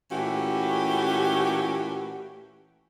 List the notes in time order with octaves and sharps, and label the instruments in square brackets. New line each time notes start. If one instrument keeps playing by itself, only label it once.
[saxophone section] A#2 E3 A3 C#4 F#4 G4